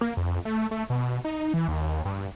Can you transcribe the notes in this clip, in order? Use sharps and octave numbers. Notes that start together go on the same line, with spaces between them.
A#3
F2
A3
A3
B2
D#4
E3
D#2
G2